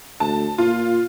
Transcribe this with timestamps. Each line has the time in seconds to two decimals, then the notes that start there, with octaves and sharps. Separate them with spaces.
0.20 D2 A5
0.58 A#2 F4